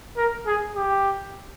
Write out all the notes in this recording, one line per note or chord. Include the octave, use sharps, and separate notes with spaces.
A#4
G#4
G4